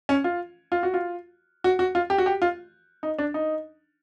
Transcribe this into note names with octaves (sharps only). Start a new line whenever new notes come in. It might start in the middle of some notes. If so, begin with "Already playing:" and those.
C#4
F4
F4
F#4
F4
F#4
F#4
F4
G4
F#4
G4
F4
D#4
D4
D#4